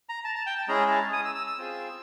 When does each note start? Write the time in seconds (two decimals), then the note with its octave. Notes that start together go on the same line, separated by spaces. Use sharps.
0.09 A#5
0.24 A5
0.35 A5
0.46 G5
0.58 A5
0.68 G#3 C#4 E4 G#4 A#5
0.91 A5
1.13 D#6
1.25 E6
1.35 E6
1.47 E6
1.58 C4 F4 G#4